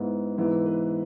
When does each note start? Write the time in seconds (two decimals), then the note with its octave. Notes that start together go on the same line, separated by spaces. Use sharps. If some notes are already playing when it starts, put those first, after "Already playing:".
Already playing: G#2 G#3 B3 E4
0.37 G#2 E3 B3
0.65 B4